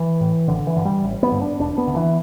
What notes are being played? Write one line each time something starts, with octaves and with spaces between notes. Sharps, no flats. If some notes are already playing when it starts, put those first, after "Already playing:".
Already playing: E3
A2
A1 D3
E3
G2 D3
G3
A1
B3
G2 D3
D4
E1 D4
B3
D2 D3
E3